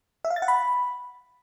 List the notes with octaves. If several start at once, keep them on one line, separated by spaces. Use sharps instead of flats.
E5
F5
A6
F#5
B5